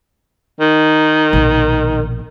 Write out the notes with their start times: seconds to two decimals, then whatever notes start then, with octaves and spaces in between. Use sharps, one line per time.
0.61 D#3
1.33 A#1 B2